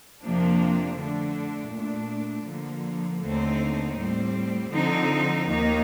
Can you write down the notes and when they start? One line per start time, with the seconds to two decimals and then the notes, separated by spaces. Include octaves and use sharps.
0.21 F2 C3 F3 A#3 D4
0.98 D3 A3 D4
1.72 A#2 A3 D4
2.47 D3 F3 A#3
3.22 D#2 D3 A3 C4 D#4
3.97 A2 G3 C4
4.72 D3 F3 C4 D#4
5.48 D#2 D#3 A#3 D#4